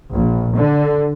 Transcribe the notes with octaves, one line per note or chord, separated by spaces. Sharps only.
A#1
D3